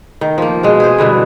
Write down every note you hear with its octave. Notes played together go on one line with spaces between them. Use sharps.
D#3
F3 A#3
B2 G#3
G#4 C5
G2 B2 D3 E3